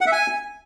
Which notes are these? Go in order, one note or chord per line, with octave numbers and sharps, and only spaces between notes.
F#5
E5
G#5